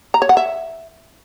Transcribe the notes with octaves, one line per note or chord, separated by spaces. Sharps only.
A#5
C#5
F#5
E5